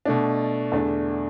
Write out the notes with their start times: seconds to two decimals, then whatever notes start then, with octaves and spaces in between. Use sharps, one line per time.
0.05 B2 A3 D4
0.72 E2 D3 A3 D4